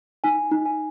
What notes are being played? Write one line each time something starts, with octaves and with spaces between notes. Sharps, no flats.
D#4 G#5
D#4
G#5